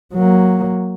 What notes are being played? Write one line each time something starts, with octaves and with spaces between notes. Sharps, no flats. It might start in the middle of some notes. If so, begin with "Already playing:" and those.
F#3 A#3